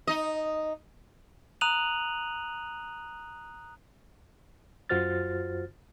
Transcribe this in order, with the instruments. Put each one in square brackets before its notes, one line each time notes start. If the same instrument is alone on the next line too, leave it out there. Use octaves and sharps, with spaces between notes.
[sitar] D#4 D#5
[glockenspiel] A#5 D#6 F#6 D#7 F7 F#7
[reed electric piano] F#2 F4 F#4 C5 F6 A6